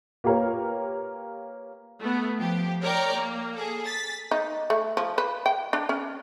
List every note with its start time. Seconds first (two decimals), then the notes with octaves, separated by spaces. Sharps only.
0.24 A#3 F4 G4 A#4 B4 C#5
2.00 A3 B3
2.37 F3 G4
2.82 A#4 C#5 D5 G5 A#5
3.15 A#3
3.55 G#4 A4
3.86 A6 B6
4.31 D#4
4.70 A3
4.97 F3
5.18 B4
5.46 G5
5.73 D4
5.89 C#4